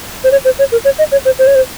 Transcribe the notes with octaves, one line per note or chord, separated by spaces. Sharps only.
C5
C#5
C5
C#5
A#4
C#5
D#5
C#5
C5
C5
C#5
C5